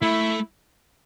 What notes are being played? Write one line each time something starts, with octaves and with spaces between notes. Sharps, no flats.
A3 E4